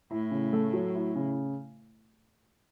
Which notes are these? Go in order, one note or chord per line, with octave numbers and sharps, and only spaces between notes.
A2 E4
C#3
A3
F#3
E4
C#3